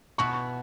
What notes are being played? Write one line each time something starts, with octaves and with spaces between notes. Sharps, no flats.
B2 B3 E4 C#6